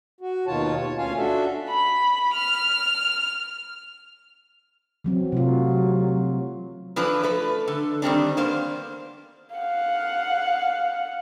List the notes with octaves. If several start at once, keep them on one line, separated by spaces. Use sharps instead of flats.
F#4
D#2 B2 D#3 F4 C#5 A5
C#5
D2 C#4 F4 F5 G#5
D4 F#4 A4 E5
B5
F6
E3 F#3 C4
C3 F#3 A3 F4
E3 F3 D4 B4
A3 B4
D3
D#3 G3 C4 D4
A#3 B3 C5
F5 F#5